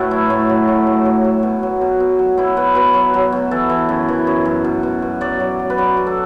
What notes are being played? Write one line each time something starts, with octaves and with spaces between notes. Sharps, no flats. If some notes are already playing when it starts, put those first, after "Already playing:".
Already playing: A2 F#4 A4 B4
F#3 E4
A2
F#3
A2
A2
F#3
F#3
B2
F#3
B2
B2
F#3
B2 E4
B2 B4
B2 B4
F#3
F#3
B2
E3 A4
E3
F#2
E3
F#2
F#2
B2
B2
B2
F#3 D5
F#3
F#3
B4
F#3 D5
B2
A4